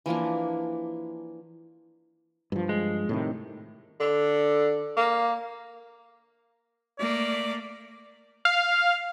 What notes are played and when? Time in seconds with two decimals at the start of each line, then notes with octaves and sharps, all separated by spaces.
0.06 E3 F3 A#3 D4
2.52 G2 F3
2.69 G#3
3.09 A2 C3 D#3
4.00 D3
4.97 A#3
6.99 A3 A#3 D5
8.45 F5